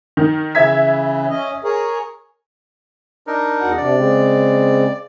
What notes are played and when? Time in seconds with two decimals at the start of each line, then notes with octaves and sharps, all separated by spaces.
0.17 D#3
0.55 C#3 E3 E5 G#6 B6
1.30 C#4 D#5
1.64 G#4 A#4 C#5
3.27 D4 D#4 A#4
3.61 E2 F#4 F#5
3.77 C3 D4 D5
3.95 C#3 G#3 C4